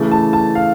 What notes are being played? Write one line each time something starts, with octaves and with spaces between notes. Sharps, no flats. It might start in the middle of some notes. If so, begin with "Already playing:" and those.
Already playing: C#3 E3 A3
A5
A5
F5